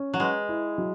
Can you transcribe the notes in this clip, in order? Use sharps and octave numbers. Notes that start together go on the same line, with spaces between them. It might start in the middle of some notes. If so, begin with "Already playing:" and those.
Already playing: C#4
F#3
G#3 B4
E4
F#3